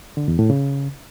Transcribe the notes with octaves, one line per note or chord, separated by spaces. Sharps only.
D3
E2
A2
C#3